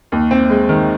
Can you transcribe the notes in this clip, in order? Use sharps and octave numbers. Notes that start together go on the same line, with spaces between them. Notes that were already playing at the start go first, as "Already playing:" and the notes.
D#2
C4
G#3
D#3